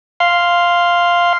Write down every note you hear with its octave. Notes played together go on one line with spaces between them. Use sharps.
F5 C6